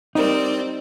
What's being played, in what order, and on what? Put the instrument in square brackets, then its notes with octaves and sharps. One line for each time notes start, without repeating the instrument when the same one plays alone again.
[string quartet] G3 C4 D5 [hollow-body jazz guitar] D#4 A#4